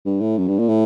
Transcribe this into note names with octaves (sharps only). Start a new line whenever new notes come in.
G2
A2
F#2
G2
A#2
A2